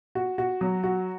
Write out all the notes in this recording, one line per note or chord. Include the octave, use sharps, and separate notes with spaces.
F#4
F#4
F#3
F#4